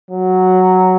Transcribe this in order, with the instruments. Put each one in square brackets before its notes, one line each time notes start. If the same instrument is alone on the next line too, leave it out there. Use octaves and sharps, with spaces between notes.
[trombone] F#3